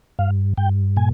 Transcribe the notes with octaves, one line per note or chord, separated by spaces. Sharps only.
G2 F5
G2 G5
A#2 G#5